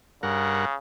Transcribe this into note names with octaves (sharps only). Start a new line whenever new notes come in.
G2 C#3 A#4 F#5